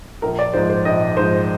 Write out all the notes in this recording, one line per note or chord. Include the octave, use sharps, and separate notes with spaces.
A#1 A#4
D5
G#2 F3 C5
C5
A#1 D#5
G#2 F3 C5